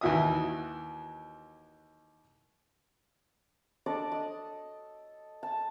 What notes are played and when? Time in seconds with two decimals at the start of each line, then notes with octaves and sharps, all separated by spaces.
0.01 D#2 D#3 E3 F#4 E5 D#6
3.86 D4 A4 D5 D#5
4.12 D#5
5.43 A5